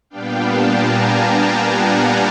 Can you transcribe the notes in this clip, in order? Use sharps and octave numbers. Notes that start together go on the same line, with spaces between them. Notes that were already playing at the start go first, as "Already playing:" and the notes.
A#2 G3 B3 D4 F5 G5
G5 A5
G#5 A#5
G5 A5
F#5 G#5
F5 G5